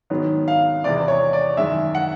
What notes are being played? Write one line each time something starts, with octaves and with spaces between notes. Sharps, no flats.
G#2 D#3 F#3 B3
F5
E2 C3 E3 G#3 D5
C#5
D5
F#2 D#3 G#3 E5
F#5